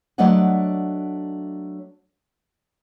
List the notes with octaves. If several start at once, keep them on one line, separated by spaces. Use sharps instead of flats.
F#3 A3 D4 D5 D#5 F#5